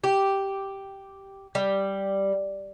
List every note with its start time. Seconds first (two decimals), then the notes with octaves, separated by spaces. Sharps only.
0.04 G4
1.55 G3